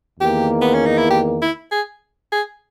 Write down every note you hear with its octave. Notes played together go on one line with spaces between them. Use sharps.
E2 D#3 A#3 G4
B3
C#4
D#4
E4
G4
E4
G#4
G#4